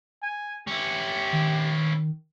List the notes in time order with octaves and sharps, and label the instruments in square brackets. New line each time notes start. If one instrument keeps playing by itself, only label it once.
[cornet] G#5
[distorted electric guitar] C#4 E4 [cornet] G4
[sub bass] D#3